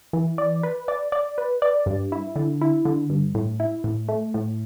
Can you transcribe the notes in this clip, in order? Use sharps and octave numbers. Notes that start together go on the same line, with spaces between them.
E3
D5
B4
D5
D5
B4
D5
G2
E4
D3
E4
D3
G2
A2
E4
A2
A3
A2